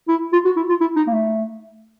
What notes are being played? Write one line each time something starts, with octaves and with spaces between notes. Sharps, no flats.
E4
F4
F#4
E4
F4
E4
D#4
A#3
A3